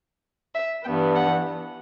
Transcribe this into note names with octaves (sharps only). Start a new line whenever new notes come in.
E5
G2 E3 B3 G5
F#5